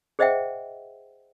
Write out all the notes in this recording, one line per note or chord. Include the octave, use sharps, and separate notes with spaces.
G#4 C5 D#5 E5 F#5 G5